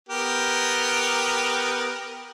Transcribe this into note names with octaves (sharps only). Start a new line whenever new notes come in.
B3 G4 A#4